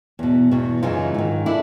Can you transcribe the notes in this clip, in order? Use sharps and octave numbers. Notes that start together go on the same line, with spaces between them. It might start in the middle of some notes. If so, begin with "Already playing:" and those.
E2 B2
E2 B2
F#2 C#3 E3 D#4 F4
G#2 D#3
D3 D4 E4